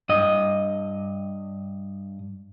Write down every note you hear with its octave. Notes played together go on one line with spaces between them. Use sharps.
G2 D#5